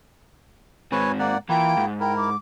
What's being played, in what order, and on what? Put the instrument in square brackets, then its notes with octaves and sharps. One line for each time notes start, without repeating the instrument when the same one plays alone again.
[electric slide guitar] G#2 C4 [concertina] B4 C#5 G#5
[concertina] A#3 D5 F#5
[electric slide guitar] E3 [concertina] A#3 E4 F4 [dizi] G5
[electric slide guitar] G#2
[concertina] E4 A#4 [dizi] G5
[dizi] D6